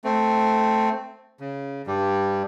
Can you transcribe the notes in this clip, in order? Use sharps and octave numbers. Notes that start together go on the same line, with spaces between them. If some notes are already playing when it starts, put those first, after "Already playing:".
A3 C4
C#3
G2 G3